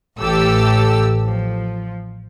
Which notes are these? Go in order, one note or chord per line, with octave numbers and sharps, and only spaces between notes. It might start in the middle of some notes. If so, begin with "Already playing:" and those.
A1 A2 G4 A4 E6
F3